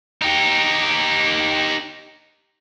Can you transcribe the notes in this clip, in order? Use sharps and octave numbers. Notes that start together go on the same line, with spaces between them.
D#4 G4